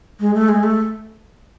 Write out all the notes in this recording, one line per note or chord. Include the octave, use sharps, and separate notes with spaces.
G#3
A3
G#3
A3